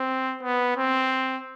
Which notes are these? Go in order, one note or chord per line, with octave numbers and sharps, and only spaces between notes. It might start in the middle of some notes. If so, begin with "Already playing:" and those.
Already playing: C4
B3
C4